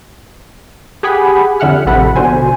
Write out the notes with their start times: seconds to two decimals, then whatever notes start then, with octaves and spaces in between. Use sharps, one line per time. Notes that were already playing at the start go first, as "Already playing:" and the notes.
1.03 G4 G#4 F#5 G#5 B5
1.60 F2 D3 E5 F#5 F6
1.86 A1 C3 F3 A4 F#5 B5
2.16 B2 D3 F#4 C5 G#5